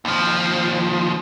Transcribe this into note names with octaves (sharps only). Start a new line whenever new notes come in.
D#2 F3